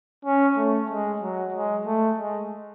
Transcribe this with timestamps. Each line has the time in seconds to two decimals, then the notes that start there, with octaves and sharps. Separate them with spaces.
0.25 C#4
0.57 A3
0.90 G#3
1.22 F#3
1.54 G#3
1.86 A3
2.19 G#3